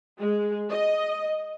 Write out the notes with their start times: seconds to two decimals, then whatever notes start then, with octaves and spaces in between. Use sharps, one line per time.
0.19 G#3
0.71 D#5